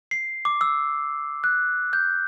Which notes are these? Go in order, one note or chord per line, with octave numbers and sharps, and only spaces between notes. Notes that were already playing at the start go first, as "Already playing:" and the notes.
C7
D6
E6
F#6
G6